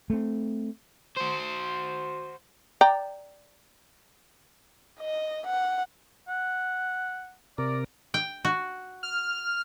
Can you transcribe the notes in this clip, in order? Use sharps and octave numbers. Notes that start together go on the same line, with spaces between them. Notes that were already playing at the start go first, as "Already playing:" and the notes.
A3 C4
F#4 C5
D5 G5 A#5
D#5
F#5
F#5
C3 A#4 D5
G5
F#4
F6